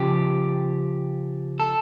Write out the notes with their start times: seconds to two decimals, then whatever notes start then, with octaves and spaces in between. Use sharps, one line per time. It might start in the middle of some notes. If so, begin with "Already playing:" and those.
Already playing: C#3 F3 G4
1.60 A4